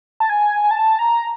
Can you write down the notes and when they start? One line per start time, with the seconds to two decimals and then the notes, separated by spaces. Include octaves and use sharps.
0.20 A5
0.29 G#5
0.64 G#5
0.71 A5
0.99 A#5